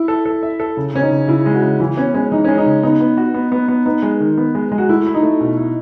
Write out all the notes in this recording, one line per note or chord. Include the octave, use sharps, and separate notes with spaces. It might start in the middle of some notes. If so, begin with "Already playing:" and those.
Already playing: E4
A4
A4
E5
A4
C#3
C#3 C#4
D#4
C#3
C#3 E4
G#3
F#4
C#3
E3 E4
B3 C#4
G#3 C#4
E3 D#4
G#3 C#4
D#4
C#3
B3 D#4
B3
F#4
B3
B3
B3
B3 D#4
G#3
D#3
B3
G#3
G#3
F#4
A3 E4
E4
D#4
A3
B2
E4